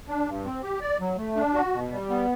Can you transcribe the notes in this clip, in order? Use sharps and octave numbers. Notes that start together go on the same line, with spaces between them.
D4
G2
C4
G4
D5
F#3
A3
D4
F#4
B2
G3
B3